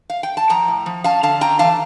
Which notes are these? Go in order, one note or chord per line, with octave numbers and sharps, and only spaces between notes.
F5
G5
A5
F3 G5 A#5
A2
F3
C#4 F5 A5
D3 F5 A5
C#4 G5 A#5
E3 F5 A5